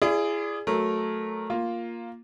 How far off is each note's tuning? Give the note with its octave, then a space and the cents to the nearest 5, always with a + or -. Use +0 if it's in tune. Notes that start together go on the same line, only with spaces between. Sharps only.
E4 +40 G#4 +0 D5 +0
F#3 +0 A3 -10 A#4 -5
A#3 +0 F4 +0